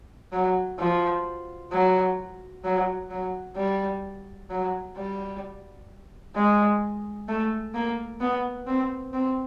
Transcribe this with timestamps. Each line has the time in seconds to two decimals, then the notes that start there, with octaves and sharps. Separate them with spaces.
0.32 F#3
0.79 F3
1.72 F#3
2.64 F#3
3.10 F#3
3.56 G3
4.50 F#3
4.97 G3
6.35 G#3
7.28 A3
7.74 A#3
8.21 B3
8.67 C4
9.13 C4